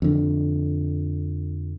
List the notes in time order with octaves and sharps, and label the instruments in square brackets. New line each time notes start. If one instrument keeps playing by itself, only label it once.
[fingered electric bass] F2 D3